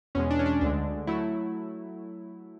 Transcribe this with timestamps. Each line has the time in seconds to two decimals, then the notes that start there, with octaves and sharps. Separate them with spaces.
0.15 E2 B2 G#3 C#4
0.31 D4
0.39 C#4
0.46 D4
0.61 D2 D3 G#3 D4
1.07 F#3 A3 E4